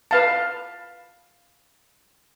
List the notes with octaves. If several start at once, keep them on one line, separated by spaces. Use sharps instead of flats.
B4 F5 A5